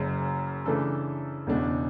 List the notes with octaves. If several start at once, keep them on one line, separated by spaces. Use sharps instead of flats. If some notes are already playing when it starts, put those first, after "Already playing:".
Already playing: F#1 F#2 C#3
C#3 E3 A3 D4 A4
E1 E2 C#3 G#3 D4